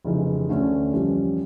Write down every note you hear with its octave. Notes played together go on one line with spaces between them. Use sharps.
F1 F2 C#3 E3
D2 D3 A3 C#4
F2 E3 G3 C#4 F4